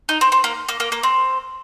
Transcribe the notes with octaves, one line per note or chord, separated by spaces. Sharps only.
D#4
C4
C4
A#3
A#3
A#3
A#3
C4